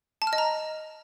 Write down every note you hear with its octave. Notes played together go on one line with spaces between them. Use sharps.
A5
F6
D#5
A#5